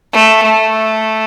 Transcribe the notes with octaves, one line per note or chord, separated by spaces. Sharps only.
A3
A3